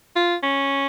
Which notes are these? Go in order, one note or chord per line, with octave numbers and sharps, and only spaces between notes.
F4
C#4